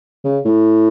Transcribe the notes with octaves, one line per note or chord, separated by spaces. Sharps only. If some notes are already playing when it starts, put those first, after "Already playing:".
C#3
A2